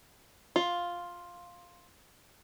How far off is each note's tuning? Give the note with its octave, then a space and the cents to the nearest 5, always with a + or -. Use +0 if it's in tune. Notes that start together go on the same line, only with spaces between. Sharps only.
F4 +5